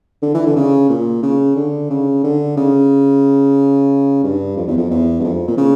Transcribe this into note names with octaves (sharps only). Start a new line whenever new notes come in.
D3
E3
D3
C#3
A#2
C#3
D3
C#3
D3
C#3
G2
F2
E2
F2
E2
G2
F2
A#2
C#3